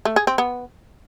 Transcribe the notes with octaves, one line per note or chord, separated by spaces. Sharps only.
A3
G#4
C4
B3